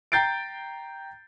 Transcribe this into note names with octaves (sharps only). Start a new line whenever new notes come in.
G5 A#5 G6 A6 C7 D7